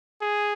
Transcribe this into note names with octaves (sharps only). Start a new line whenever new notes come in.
G#4